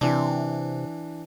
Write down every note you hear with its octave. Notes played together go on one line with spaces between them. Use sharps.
C3 E3 D4